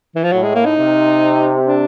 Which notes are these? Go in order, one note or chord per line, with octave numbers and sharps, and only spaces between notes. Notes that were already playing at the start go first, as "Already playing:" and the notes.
E3
F3
A2 F#3
G#3
A#3
D#4
C3
D4